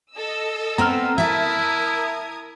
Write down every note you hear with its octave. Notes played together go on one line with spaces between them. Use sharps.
A4 D#5 E6
B3 C4 A#5 F6
E4 A#4 E5 A5 D#6 G#6